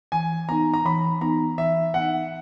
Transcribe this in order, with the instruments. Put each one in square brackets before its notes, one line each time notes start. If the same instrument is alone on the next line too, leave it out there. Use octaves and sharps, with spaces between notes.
[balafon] E3 [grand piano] G#5
[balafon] B3 D#4 [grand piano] A#5
[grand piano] A#5
[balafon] E3 [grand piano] B5
[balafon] B3 D#4 [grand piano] A#5
[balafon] E3 [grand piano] E5
[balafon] B3 D#4 [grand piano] F#5